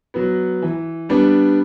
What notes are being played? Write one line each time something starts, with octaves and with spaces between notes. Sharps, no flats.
F#3 B3
E3
G3 B3 D4